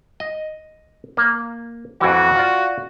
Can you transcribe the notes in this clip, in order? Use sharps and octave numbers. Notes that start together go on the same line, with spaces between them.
D#5
A#3
F2 E3 F#4
F4 D5